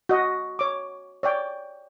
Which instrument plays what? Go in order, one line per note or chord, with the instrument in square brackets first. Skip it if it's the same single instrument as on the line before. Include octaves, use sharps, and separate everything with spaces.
[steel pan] F#4 D#5
C#5 D6
C#5 D5 G5